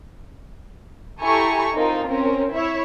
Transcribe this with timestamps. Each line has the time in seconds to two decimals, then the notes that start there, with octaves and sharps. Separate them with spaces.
1.21 E4 G4 A4 G#5 A#5 C#6
1.74 C4 D#4 F4 A#4
2.05 C4 C#4 A#4
2.53 E4 C#5 E5